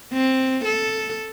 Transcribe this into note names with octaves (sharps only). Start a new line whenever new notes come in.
C4
A4